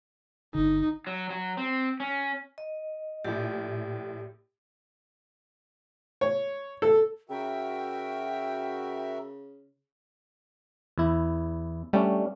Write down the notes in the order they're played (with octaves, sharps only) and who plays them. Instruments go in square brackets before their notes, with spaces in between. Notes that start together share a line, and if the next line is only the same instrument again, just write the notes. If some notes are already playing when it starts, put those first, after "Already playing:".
[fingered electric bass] G1 D3 [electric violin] D#4
[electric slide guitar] F#3
F#3
C4
C#4
[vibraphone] D#5
[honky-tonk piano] A#1 A2 [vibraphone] G4
[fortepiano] C#5
A4
[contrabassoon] C#3 [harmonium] F#4 A#4 E5 [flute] G5
[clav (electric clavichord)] E2 E4
[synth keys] G3 [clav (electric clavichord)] A3 C#4 D4